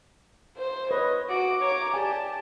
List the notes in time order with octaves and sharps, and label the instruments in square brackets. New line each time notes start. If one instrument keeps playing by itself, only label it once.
[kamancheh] C5
[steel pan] B4 [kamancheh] C#5 [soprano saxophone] D#5
[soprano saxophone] F#4 [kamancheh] D6
[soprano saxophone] C#5 [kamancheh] A#5 D6
[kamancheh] G4 A5 [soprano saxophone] D5 [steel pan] G#5